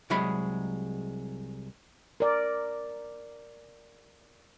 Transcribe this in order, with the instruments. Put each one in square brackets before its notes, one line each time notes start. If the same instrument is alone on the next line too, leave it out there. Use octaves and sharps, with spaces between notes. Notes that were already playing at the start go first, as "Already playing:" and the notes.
[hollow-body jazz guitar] C2 F#3 G#3 G#4 B5
[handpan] A#4 D5